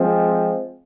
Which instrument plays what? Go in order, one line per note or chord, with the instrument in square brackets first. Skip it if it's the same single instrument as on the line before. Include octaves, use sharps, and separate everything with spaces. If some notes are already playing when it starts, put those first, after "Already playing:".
Already playing: [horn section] F3 G#3 C4